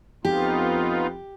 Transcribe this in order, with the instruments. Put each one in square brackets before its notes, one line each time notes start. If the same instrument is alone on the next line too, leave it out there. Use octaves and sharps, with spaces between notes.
[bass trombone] F2 [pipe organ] B3 D#4 F4 [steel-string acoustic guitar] G4